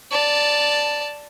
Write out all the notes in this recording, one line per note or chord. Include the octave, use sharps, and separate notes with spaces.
D5 A5